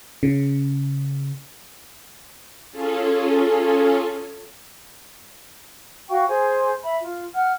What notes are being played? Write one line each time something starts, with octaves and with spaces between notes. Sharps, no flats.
C#3
C#4 F4 G#4 A4
F#4 F5 G5 C#6
G#4 C5 G#5
E5 B5
F4
F#5 F6